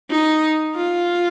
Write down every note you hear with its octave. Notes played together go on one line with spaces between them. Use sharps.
D#4
F4